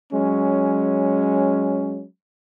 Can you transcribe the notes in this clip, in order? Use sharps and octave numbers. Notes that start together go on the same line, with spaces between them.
F#3 G#3 C#4